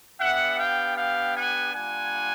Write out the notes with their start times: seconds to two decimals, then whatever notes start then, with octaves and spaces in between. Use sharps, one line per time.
0.20 B3 D4 G4 E5 F#5
0.58 F5 G5
0.96 F5 G5
1.35 F#5 G#5
1.74 G3 A#3 D4 F4 F#5 G#5